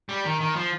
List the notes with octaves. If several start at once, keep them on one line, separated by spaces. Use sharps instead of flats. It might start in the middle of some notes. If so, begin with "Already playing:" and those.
G3
D#3
D#3
F3